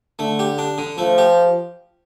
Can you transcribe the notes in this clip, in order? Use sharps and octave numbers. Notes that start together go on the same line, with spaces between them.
D3 A3
G4
D4
D3
F3 A3
G4